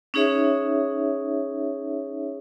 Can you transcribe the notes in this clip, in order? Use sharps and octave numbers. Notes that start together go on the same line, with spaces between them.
C#4 D#4 G#4 C#5 E5